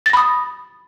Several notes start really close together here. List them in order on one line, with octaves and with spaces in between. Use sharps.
A6 A#6 B5 D#6